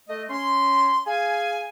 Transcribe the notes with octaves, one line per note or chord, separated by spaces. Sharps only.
A3 D#5
C#4 C6
G#4 F5 G#5